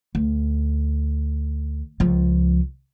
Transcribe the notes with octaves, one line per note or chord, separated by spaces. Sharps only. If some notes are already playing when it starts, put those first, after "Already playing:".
D2
C#2 F3